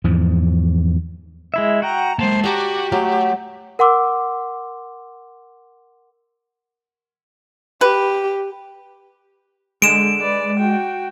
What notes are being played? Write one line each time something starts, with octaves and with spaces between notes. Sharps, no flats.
E2 G#2 F3
G#3 E4 E5
F#4 F#5 G5 A#5
G#3 A#3 C5 A5
F#4 G4 D5 F#5 A#5 D6
F#3 A3
A#4 F#5 C6 D6 E6
G4 B4
D3 G#3 D7 E7
B4 D5
F#4 G5